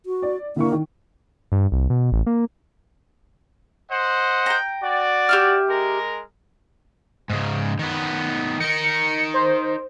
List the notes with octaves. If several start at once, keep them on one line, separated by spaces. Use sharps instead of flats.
F#4
D5
D3 A#3 E4 C#6
D#3
G2
C2
B2
A1
A#3
C5 D#5 F#5
G5 A#5
F#4 D5
G4 E5 F6
G#3 A#4
G#2 C#3
D#3 B3
D#4 A#4 C#7
C5